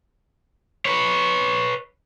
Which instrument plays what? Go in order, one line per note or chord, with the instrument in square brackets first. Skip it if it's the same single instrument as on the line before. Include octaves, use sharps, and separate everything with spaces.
[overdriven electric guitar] B4 C#5